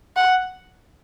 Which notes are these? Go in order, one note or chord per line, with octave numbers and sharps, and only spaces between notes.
F#5